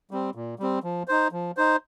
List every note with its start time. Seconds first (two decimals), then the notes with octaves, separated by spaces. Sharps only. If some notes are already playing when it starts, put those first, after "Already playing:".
0.11 G3 C4
0.35 A#2
0.59 G3 C4
0.84 F3
1.08 D#4 C5
1.32 F3
1.57 D#4 C5